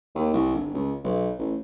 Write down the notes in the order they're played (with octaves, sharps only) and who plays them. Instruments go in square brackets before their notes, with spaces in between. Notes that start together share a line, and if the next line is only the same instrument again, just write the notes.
[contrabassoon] D#2
C2
G1
C#2
B1
A1